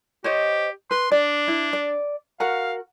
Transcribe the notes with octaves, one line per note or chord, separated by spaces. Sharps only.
G4 C5 C#5 D#5
B4 C6
D4 D5
E4
D5
F#4 A#4 F5 F#5